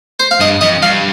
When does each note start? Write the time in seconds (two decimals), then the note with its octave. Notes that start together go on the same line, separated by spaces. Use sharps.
0.20 C5
0.31 F5
0.40 G2 D#5
0.61 F2 D#5
0.82 G2 F5